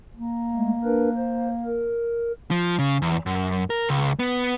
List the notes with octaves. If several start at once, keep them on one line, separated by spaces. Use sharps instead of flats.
A#3
G#3 A3
D4 A#4 B4
C5
A#4
F3
C#3
E2
F#2
A#4
C#2
B3